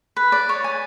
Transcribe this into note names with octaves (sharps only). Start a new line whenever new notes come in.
B4
D5
C#5
G#5